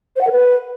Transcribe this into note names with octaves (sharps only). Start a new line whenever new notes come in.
C5
F#5
A#4
B4